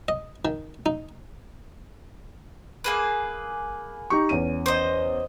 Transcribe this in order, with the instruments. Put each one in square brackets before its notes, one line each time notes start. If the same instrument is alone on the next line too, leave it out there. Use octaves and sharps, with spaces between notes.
[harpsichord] D#5
D#3
D#4
[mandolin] A#3 G#4 B4
[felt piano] D#4 G4 C#6
E2 C#4 D#7
[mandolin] C5 D#5